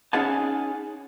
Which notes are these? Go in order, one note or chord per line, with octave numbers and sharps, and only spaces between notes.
C#4 D#4 G#4 F#5 G#5 A5